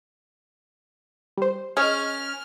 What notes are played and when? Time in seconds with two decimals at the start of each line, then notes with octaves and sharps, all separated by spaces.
1.38 G3 C5
1.77 C#4 G#4 D#5 F6